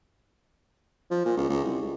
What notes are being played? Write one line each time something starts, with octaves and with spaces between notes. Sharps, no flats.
F3
A#2
C#2
C#2
C2
C#2